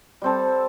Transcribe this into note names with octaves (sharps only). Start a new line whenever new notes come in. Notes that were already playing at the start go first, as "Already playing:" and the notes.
G3 C4 A4